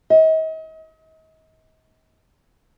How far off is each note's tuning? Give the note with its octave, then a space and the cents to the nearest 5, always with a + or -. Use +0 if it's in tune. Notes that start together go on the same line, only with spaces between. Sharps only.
D#5 +40